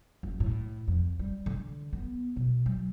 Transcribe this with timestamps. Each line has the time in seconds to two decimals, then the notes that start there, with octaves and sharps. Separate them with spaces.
0.23 F#1
0.40 A2
0.88 F2
1.19 G3
1.46 D3
1.93 B3
2.36 B2
2.66 F#3